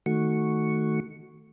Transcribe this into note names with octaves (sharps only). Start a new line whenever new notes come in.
D#3 A3 F#4 C#6